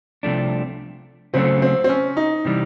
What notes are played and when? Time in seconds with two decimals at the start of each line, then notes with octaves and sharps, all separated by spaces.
0.23 C2 C3 F3 A3 D4
1.34 C#3 F#3 A3 C4
1.62 C4
1.84 C4
1.89 C#4
2.17 D#4
2.45 C3 E3 G3